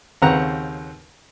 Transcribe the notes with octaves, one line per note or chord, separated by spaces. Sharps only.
D#2 C#3 C4 B4 F#5 A#5